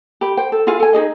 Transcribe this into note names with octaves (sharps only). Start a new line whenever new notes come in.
G4 B5
C5 G5
A4
E4 F4 G#4 F5
A4 G#5
D#4 F#4 G#4 D#5